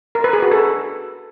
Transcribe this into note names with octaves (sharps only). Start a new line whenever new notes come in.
A#4
B4
G#4
F#4
A4